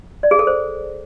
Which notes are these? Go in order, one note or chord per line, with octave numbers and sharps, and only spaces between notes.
D5
G#4
A4
C5